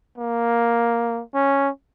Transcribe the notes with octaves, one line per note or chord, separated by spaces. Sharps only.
A#3
C#4